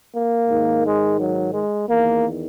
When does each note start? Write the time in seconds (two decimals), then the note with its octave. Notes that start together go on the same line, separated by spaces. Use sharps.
0.15 A#3
0.50 G#2 D#3
0.85 G#3
1.19 F#3
1.54 G#3
1.88 E2 D#3 A#3